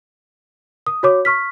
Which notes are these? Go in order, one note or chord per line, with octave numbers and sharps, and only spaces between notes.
D#6
F#4 C#5 D6
C#6 F6 B6